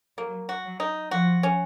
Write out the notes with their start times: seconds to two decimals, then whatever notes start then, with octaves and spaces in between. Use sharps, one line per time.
0.17 F#3 A#3
0.49 F#4
0.65 F#3
0.80 D#4
1.11 F3 F#4
1.43 C#4